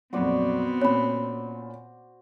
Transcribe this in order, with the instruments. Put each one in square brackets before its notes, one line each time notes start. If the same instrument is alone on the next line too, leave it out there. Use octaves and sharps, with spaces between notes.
[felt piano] F2 A#2 F#3 [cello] B3 C4 [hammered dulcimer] F#4 C5 D5
[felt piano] A#2 C#4 [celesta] C#5 B5